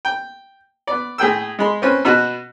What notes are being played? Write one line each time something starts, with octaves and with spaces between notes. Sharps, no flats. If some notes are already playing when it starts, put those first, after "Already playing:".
G5
B3 D5
A2 G#4 G5 E6
G#3 B5 C6
C4 C#4 B4
B2 B3 F#4